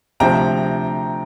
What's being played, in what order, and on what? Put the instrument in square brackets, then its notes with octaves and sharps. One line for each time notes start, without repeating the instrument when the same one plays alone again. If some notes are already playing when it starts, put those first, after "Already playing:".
[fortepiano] D2 C3 F3 [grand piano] G5 A#5